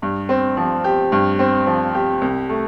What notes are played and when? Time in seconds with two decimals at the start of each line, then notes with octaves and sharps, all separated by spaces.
0.02 G2
0.29 C4
0.57 F3
0.84 G4
1.12 G2
1.39 C4
1.67 F3
1.95 G4
2.22 C2
2.49 A3